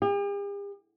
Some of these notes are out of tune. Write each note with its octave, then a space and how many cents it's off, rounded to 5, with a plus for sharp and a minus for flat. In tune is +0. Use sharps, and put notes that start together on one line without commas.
G4 +45